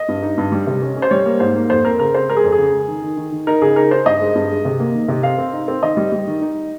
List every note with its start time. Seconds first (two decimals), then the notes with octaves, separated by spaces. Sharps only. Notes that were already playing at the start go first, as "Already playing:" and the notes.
Already playing: D#5
0.08 G2
0.22 D#4
0.38 G2
0.52 G3
0.67 C3
0.82 C#4
0.96 C#4
1.02 C5
1.11 G3 C#5
1.26 A#3
1.40 G#2 C5
1.55 A#3
1.70 F2 C5
1.85 C4 A#4
1.99 C#3 A#4
2.14 C4 C5
2.29 G#3 A#4
2.37 G#4
2.44 F2
2.52 G#4
2.58 C#3
2.73 G#3
2.88 D#3
3.03 D#3
3.17 D#3
3.32 D#3
3.47 D#4 A#4
3.62 C#3 G#4
3.76 D#4 A#4
3.91 D#4 C5
4.06 G2 D#5
4.21 G#3
4.35 G2
4.50 G#3
4.65 C3
4.80 A#3
4.94 D#3
5.08 C3
5.23 C4 F5
5.38 C4
5.53 D#4
5.68 C4
5.82 D#3 D#5
5.97 G3
6.12 G3
6.27 D#3
6.41 D#4